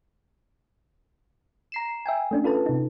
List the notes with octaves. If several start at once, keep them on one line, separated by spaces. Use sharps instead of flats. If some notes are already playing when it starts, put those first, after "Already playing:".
A#5 C7 E7
E5 G5 G#5
A3 C#4 D4
F4 A4 B4 A5
C3 D#4